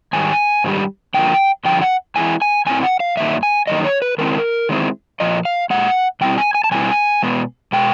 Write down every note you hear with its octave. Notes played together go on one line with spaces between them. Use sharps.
G#2 D#3 G3 G#5
G#2 D#3 G3
G2 D3 F3 A#3 G5
G2 D3 F3 G5
F#5
A2 E3 G#3 C4 E4 G#5
G#5
A2 E3 G#3 C4 E4 G#5
F#5
F5
G2 D#3 F#3 A#3 D#4 E5
G#5
G2 D#3 F#3 A#3 D#4 D#5
C#5
B4
D#3 G#3 C4 E4 A#4
D#3 G#3 C4 E4
A#2 F3 D#5
F5
A#2 F3 G#3 F#5
B2 G3 C4 E4 G5
G#5
G#5
A5
B2 G3 C4 E4 G#5
B2 G#3 B3
B2 G#3 G5